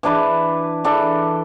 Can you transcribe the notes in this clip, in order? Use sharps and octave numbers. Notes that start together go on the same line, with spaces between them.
E3 D4 B4
E3 D4 A4